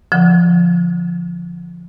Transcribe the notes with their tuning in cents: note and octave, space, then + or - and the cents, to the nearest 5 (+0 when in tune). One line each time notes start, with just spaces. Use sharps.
D3 -20 F3 -10 F#5 +0